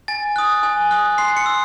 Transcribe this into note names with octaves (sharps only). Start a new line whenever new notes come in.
G#5 A6
D#6 F#6
G#5
D#6 F#6
C6 C7
C#7
E6